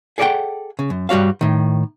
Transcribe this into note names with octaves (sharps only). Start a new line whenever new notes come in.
G#4 A4 D5 D#5 F#5 G5
C#3
F#2
G2 G3 F#4 C#5 F5
A2 D#3